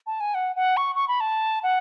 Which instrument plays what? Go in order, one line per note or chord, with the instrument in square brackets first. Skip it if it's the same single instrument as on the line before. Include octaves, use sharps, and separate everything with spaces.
[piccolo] A5
G#5
F#5
F#5
C#6
C#6
B5
A5
F#5